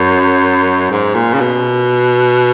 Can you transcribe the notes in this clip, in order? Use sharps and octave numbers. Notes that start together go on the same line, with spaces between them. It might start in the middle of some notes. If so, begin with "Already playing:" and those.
Already playing: F#2
G#2
A#2
C#3
B2